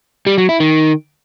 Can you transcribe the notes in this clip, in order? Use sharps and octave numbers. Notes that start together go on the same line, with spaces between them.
G3
F#3
E4
D#3